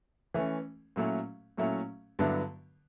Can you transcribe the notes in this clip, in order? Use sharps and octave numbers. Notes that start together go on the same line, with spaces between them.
E3 A3 C#4
A#2 F#3 A3 C#4 E4
A#2 F#3 A3 C#4 E4
G2 D3 F#3 B3 E4